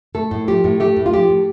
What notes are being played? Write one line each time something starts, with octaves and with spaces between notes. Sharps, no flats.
A3 A4
A2
F3 G4
A2
A3 G4
A2
F4
F3 G4
A2